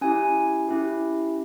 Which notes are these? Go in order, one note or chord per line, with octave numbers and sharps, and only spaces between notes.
C#4 E4 G4 G#5
C#4 E4 G4